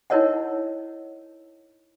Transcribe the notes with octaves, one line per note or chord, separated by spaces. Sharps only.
D#4 E4 A#4 C#5 D#5 F#5